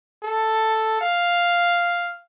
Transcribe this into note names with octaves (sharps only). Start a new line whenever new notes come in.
A4
F5